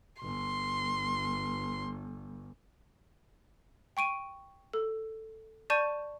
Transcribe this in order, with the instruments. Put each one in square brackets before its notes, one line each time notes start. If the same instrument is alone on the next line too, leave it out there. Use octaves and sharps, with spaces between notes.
[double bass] G1 [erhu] C6
[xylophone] G5 C#6 D7 D#7
A4
D5 A5 C#6 G6 D#7